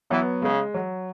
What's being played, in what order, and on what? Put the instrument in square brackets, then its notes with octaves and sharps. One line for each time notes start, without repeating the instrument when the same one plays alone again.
[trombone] E3 [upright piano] F#3 B3
[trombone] C#3 [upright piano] G#3
[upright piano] F#3